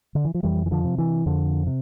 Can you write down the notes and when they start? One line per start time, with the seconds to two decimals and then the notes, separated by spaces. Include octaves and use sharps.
0.15 D3
0.25 E3
0.34 F3
0.43 F2 E3 G3
0.66 E3
0.71 D3 F3
0.84 C3
0.98 E3
1.26 F2 D3
1.67 C3